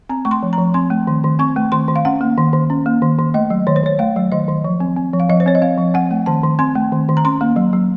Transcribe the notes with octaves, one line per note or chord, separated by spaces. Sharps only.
C4 A#5
A3 C#6
C6
F3
A#5
F3
C4 C6
A3
D#3
D#3
C4 C#6
A3
D#3 C6
D#3
F5
C#4 F#5
A#3
D#3
D#3
C#4
A#3
D#3
D#3
A3 D#5
F#3
D#3 C#5
C5
D#3 C#5
A3 F5
F#3
D#3 D#5
D#3
F3
C4
C4
F3
F5
F3 D#5
C5
C4 C#5
D#5
C4 F5
F3
C4 F#5
A3
D#3 A5
D#3
C4 C6
A3
D#3
D#3
A#5
C#4 C6
A#3
F#3
F#3